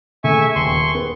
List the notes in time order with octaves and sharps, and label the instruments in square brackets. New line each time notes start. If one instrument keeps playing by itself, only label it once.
[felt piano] C#3 A3 [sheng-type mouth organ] E5 G#5 C#6
[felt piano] D#1 [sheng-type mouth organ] C6 C#6
[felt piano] B3